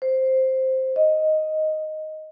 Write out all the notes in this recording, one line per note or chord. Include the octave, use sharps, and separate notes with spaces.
C5
D#5